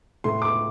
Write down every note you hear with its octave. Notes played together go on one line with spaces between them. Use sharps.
A2 C6
D6